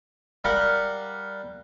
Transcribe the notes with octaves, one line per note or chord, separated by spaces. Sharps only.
G3 A#4 F5 F#5